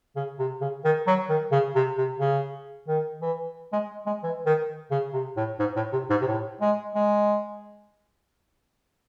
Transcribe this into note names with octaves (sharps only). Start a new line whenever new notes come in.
C#3
C3
C#3
D#3
F#3
D#3
C#3
C3
C3
C#3
D#3
E3
G#3
G#3
E3
D#3
C#3
C3
A2
G#2
A2
C3
G#2
C3
A2
G#3
G#3